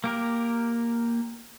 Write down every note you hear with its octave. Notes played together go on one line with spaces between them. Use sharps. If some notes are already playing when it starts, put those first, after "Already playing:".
A#3 G4 A#4